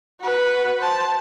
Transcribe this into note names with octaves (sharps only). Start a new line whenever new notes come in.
F#4 B4
C5 A5